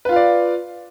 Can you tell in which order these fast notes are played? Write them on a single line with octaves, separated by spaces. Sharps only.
B4 F4 F5 D5